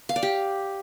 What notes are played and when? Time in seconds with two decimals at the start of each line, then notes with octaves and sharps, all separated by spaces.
0.09 F5
0.16 D5
0.23 G4